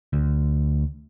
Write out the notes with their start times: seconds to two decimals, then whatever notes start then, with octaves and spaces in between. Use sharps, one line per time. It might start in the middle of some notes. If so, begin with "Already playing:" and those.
0.13 D2